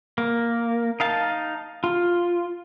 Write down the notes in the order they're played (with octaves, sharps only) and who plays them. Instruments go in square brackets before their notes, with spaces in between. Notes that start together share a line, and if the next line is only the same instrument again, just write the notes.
[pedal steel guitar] A#3
D#4 F5 A5
F4